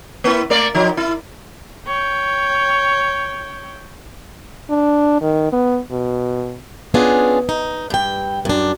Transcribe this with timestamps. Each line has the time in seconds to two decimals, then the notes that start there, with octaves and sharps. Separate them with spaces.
0.24 A#3 E4
0.50 A3 A#3 D5
0.75 F3 D#4
0.97 E4
1.86 C#5 G5
4.70 D4
5.22 D#3
5.53 B3
5.92 B2
6.94 B3 C#4 D4 F4 G#4
7.49 D#4
7.90 G2 G5
8.45 F#2 D4